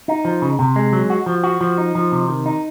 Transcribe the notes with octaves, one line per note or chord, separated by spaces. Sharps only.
D#4
F3
C#3
C3
G#3
F#3
F#4
F3
F#4
F3
D#4
F3
C3
D#3
D#4